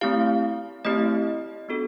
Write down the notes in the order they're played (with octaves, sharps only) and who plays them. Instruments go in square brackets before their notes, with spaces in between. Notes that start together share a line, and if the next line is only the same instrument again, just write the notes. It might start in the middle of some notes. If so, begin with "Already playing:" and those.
[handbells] A3 C4 E4 G4 F5
A3 C4 E4 G4 D#5
B3 D4 F#4 A4